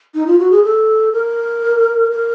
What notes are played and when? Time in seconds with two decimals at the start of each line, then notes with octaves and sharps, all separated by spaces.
0.15 D#4
0.27 F4
0.39 F#4
0.51 G#4
0.63 A4
1.13 A#4
2.11 A#4